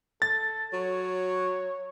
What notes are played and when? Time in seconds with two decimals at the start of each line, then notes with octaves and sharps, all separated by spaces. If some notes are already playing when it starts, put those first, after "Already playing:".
0.22 A4 A6
0.73 F#3 C#5